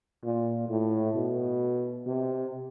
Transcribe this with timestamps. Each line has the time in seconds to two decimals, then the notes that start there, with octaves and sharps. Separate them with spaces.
0.24 A#2
0.69 A2
1.15 B2
2.06 C3